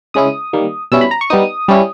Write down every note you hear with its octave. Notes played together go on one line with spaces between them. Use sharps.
C#3 G#3 C#4 E4 D#6
D#3 G3 A#3
B2 G3 C#4 E4 E6
B5
A#5
C#6
G3 B3 D#4 D#6
G3 C#4 E4